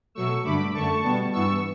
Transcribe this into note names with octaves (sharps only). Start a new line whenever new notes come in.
B2 F#3 A3 C#6 E6
G2 D3 A3 B5 D6
F#2 D3 A3 A5 C#6
B2 G3 B3
G2 E3 B3 C#6 E6